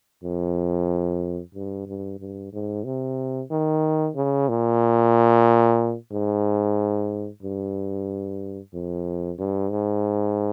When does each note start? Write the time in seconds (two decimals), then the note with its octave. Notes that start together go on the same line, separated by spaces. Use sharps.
0.23 F2
1.54 G2
1.87 G2
2.20 G2
2.53 G#2
2.84 C3
3.51 D#3
4.16 C#3
4.49 A#2
6.12 G#2
7.42 G2
8.73 F2
9.39 G2
9.71 G#2